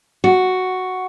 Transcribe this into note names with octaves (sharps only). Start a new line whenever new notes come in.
F#4